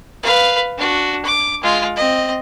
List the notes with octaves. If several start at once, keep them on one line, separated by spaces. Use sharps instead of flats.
B4 F5
D4 F#4
D6
G#3 F4
C4 D#5